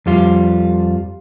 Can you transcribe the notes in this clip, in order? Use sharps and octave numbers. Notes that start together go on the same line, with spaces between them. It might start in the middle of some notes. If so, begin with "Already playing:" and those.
F2 G3 F4